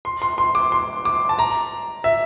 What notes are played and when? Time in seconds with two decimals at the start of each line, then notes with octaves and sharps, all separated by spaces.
0.05 C6
0.22 C6
0.38 C6
0.55 D6
0.72 C6
1.05 D6
1.29 A5
1.39 A#5
2.04 E5